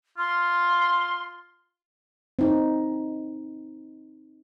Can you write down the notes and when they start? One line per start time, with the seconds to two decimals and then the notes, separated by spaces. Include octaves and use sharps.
0.18 F4 C6
2.39 C4 D#4